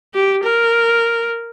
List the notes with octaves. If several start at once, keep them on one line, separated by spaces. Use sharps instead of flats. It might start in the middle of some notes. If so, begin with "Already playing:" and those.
G4
A#4